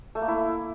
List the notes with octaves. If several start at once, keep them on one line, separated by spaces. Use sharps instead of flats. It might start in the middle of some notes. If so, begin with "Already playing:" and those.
A3
A#3
E4